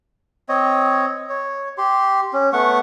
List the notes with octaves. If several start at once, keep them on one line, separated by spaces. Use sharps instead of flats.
C4 C#5 D#5
C#5
G4 C6
C#4
A3 B3 F#5 C#6